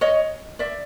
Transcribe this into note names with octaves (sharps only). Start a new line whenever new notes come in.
C#5 D#5
D5 E5